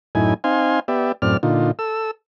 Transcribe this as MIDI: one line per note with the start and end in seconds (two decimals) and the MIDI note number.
0.15 0.34 42
0.15 0.34 45
0.15 0.34 63
0.15 0.34 64
0.15 0.34 80
0.44 0.80 60
0.44 0.80 63
0.44 0.80 77
0.44 0.80 80
0.44 0.80 84
0.88 1.12 59
0.88 1.12 67
0.88 1.12 74
0.88 1.12 76
1.22 1.37 42
1.22 1.37 45
1.22 1.37 60
1.22 1.37 74
1.22 1.37 89
1.43 1.71 46
1.43 1.71 50
1.43 1.71 63
1.43 1.71 65
1.79 2.11 69
1.79 2.11 88